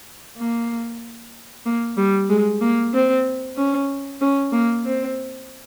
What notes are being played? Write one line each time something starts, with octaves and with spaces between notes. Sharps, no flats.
A#3
A#3
G3
G#3
A#3
C4
C#4
C#4
A#3
C4